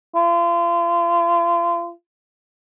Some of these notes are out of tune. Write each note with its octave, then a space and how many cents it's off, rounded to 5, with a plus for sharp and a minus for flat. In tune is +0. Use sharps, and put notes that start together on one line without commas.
F4 -35